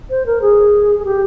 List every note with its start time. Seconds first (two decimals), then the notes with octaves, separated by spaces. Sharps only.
0.10 C5
0.26 A#4
0.41 G#4
0.99 G#4
1.05 G4